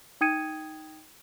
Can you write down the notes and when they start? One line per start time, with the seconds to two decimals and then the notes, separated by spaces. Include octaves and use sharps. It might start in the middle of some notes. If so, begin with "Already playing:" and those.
0.21 D#4 G5 D#6 G#6 C#7 D#7